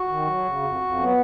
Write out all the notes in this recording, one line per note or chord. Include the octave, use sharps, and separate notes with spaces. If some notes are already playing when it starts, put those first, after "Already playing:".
Already playing: F#4
D#3
F#3
C#3
F2
F2
F#3 B3